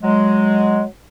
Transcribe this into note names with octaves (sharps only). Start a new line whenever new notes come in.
F#3 G#3